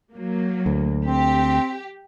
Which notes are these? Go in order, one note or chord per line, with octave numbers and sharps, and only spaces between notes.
F#3 A#3
D2
C4 G4